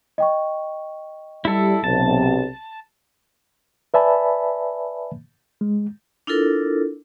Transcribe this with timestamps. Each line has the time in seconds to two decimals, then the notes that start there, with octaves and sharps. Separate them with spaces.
0.18 D#5 G5 C#6
1.45 G3 E4 A4
1.84 B1 C3 A5
3.94 B4 D5 E5 G#5 A5 B5
5.61 G#3
6.27 D4 E4 F4 A4 A#4